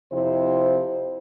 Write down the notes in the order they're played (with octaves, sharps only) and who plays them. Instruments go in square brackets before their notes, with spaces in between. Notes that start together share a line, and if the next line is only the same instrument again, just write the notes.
[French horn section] F2 C3 E4 C5